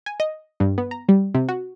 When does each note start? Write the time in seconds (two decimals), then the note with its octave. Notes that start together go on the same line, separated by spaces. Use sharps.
0.06 G#5
0.20 D#5
0.60 G2
0.78 B3
0.91 A#5
1.09 G3
1.34 C3
1.49 F#4